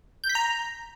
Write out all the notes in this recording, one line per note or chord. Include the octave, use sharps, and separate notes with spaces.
G6
B6
A#5